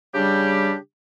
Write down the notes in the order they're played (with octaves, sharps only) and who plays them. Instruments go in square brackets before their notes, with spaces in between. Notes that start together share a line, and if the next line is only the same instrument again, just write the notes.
[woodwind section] C#3 G3 D4 G4